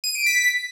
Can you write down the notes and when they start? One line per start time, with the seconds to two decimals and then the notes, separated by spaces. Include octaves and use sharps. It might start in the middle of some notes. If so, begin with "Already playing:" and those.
0.04 D#7
0.15 D7
0.26 B6